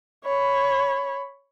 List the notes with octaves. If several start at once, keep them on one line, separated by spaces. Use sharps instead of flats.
C#5 B5